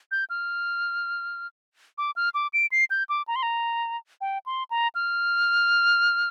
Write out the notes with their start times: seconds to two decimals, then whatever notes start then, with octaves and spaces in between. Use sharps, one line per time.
0.11 G6
0.30 F6
1.98 D6
2.16 F6
2.34 D6
2.53 D7
2.72 C7
2.90 G6
3.09 D6
3.28 A#5
3.36 C6
3.43 A#5
4.21 G5
4.46 C6
4.71 A#5
4.95 F6